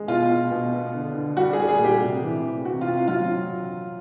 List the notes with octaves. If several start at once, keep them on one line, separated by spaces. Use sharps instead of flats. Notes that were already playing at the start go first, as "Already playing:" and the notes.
Already playing: G#3
B2 F4
B2
B2
B3
D3
D3
G3 F#4
G#4
G3
G#4
A#2 G4
C3
E3
C3
C3 F#4
F4
C3
F4
F#3 F4